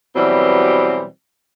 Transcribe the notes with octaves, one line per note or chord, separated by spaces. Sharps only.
B2 E3 F#3 G3 C4